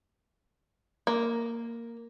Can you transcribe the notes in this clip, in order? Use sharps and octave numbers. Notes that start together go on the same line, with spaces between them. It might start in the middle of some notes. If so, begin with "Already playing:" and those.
A#3